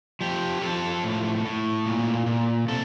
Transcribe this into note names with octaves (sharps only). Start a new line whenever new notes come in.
F3 G4
F3 A4
A2
A2
A#2
A#2
C3 A4